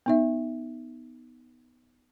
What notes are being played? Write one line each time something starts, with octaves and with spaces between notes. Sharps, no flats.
B3 D#4 E5